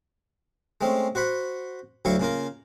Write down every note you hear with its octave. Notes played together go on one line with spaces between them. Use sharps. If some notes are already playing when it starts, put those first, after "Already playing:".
G#3 A3 C4 C#4
F#4 C5 F#5 B5
D2 F#3 E4 F5 C#6
C#3 A#3 F4 A#4